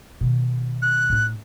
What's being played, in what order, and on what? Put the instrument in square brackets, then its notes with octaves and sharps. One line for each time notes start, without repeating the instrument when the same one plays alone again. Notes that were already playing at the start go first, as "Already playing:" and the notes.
[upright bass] B2 D#3
[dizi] F#6
[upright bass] A2 D#4